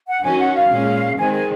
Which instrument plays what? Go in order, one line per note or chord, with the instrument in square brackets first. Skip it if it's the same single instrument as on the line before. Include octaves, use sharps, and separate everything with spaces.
[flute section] F#5
[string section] D#3 F#3 C#4 [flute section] G#5
[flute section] F#5
F5
[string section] A#2 G#3 C#4
[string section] D#3 G#3 C4 [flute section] G#5
[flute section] G#5